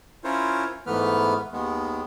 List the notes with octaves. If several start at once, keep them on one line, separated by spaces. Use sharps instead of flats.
C#4 E4 F4 A#4 C5 C#5
G#2 E3 A3 B3 B4 F6
D#2 D#3 G#3 B3